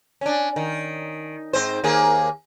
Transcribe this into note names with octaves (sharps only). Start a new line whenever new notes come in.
C#4 D4
D#3
G#2 C4 C5
D#2 A#3 G#4